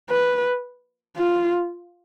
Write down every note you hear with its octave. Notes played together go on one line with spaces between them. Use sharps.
B4
F4